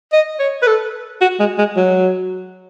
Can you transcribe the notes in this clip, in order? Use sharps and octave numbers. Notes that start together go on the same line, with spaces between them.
D#5
C#5
B4
A4
F#4
G#3
G#3
F#3